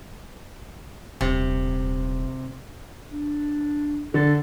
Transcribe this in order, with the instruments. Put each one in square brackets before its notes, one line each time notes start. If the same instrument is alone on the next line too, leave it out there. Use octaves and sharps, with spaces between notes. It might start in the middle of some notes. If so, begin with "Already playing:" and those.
[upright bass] D#1 [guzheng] C3
[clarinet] D4
[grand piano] D3 [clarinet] A4